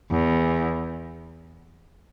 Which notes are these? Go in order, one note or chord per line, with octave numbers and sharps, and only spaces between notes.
E2